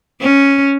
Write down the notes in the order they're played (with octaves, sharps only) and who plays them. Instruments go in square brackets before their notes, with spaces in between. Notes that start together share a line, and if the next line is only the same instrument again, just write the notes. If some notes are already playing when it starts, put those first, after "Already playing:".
[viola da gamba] C#4